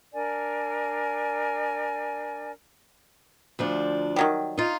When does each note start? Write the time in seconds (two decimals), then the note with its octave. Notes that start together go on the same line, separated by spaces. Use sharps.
0.14 D4 A#4 D5 G#5
3.59 D2 F3 D4
4.16 D#3 F#3 G3
4.57 D#4 F4